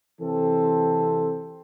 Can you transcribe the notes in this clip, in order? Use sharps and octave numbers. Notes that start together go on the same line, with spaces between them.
C3 E3 C4 A4